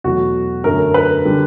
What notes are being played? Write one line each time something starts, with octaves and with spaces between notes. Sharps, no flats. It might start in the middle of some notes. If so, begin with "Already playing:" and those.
E2 B2 F#3 A3 F#4
F#2 D3 F#3 A3 A#4
B4
D3 G3